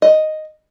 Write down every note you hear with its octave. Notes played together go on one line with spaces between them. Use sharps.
D#5